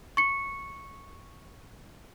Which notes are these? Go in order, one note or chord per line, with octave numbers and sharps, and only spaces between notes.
C#6 C#7